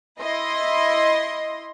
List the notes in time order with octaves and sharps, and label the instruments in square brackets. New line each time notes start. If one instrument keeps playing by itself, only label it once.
[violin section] E4 D#5 C6